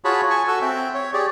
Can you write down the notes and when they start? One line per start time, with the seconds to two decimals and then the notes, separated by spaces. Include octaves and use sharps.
0.05 F4 F#4 G#4 C#5 A5 B5
0.30 G#5 A5 C#6
0.48 F#4 A4 E6
0.62 C4 E5 G5
0.94 C#5
1.13 G4 G#4 D5